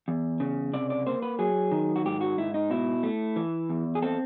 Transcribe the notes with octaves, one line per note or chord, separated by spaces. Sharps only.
E2
C#3
C3 D5
D5
A#3 C5
B4
F#3 G#4
D#3
F#4
G#2 G4
F#4
G#2 E4
D#4
B2 E4
A3
E3
E2
G#4
C4 A4